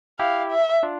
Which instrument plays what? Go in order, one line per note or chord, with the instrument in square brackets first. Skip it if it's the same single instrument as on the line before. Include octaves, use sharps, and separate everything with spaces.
[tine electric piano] E4 G4 [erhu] F5
[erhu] E5
[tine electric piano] D4 F4